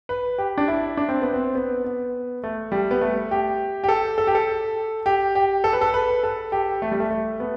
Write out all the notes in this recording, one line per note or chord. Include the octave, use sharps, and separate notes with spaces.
B4
G4
D4
E4
D4
C4
B3
C4
B3
B3
A3
G3
B3
A3
G4
G4
A4
A4
G4
A4
G4
G4
A4
B4
A4
B4
A4
G4
A3
G3
A3
A3
B3